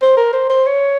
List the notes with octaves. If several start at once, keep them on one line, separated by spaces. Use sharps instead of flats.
C5
A#4
C5
C5
C#5